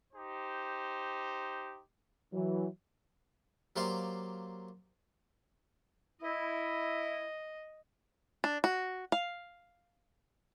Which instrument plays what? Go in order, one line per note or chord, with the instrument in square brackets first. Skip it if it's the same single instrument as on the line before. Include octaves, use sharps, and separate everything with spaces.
[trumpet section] D#4 G4 C5
[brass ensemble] E3 F#3
[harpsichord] F#3 A#3 G4 C5 D5 F5
[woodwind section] E4 [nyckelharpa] D#5
[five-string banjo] D4
F#4
F5